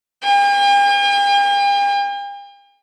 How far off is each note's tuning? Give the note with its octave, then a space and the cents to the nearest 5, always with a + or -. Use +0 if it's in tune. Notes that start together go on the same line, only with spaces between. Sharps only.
G5 +45